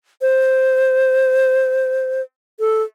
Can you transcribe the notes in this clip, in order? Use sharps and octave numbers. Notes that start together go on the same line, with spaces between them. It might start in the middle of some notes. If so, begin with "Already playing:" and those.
C5
A4